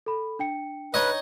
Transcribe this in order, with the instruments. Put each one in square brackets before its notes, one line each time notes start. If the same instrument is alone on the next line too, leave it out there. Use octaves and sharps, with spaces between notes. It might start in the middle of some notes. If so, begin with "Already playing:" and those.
[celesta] A4 B5
D4 G5 C#7
[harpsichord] D#4 C#5 D#5 [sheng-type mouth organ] B4